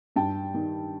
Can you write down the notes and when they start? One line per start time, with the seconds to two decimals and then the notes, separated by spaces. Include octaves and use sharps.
0.16 G2 G5 A5
0.54 D#3